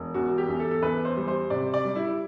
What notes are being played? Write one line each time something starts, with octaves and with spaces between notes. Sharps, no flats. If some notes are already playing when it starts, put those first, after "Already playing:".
Already playing: E1
E2 F#4
G4
E2
A4
A4
E2 B4
C5
G3
C5
C3 D5
D5
G3
E4